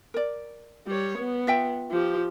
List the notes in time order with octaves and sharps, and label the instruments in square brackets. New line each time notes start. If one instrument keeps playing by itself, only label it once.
[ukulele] A#4 D5
[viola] G3 C#5
B3
[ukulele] F4 E5 G5
[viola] F3 G4